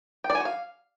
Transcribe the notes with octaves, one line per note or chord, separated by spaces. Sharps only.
G5
D5
G#5
F#4
F5